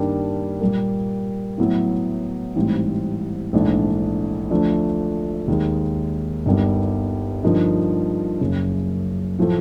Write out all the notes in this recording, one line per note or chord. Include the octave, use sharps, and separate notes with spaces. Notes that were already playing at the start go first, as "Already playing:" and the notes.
Already playing: G2 D#3 G3 A#3 D4
A#2 G3 A#3
A2 F#3 B3 E4
A1 G#2 E3 G3 C4
A#1 G#2 E3 A3 D4
D2 D3 F3 A3 D4
D#2 D#3 G#3
G1 G2 D#3 G3 B3
G2 D3 F3 A#3 D#4
F#1 F#2 C#3
A2 F3 A3